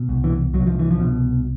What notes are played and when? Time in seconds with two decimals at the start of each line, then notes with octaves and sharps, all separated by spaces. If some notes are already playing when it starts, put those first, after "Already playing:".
Already playing: B2
0.09 C2
0.24 E3
0.54 C2 F#3
0.67 F3
0.79 E3
0.91 F3
0.99 B2